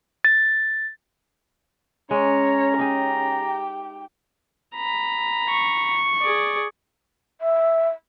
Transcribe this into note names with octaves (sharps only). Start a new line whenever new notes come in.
A6
G#3 C#4 C#5 A#5
D#4 G4 G#4 G5
A#5 B5
C#6
G#4 D5
E5